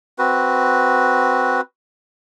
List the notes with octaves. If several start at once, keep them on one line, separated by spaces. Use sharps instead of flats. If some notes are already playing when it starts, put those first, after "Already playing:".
C4 F#4 B4